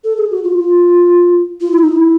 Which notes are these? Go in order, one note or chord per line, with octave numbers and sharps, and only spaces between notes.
A4
G#4
F#4
F4
F4
F4
E4
D#4
E4